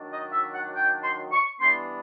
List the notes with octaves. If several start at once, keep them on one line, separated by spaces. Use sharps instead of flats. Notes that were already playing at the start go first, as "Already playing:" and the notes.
Already playing: D#3 F#3 A3 D4
D#5
E5
F#5
G5
C6
C#6
E3 G3 B3 D4 C6